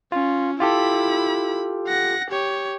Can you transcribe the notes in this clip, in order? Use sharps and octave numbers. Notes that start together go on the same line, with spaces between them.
C#4 F4
E4 F4 G4 A4 B5
F#5 A#6
G4 C#5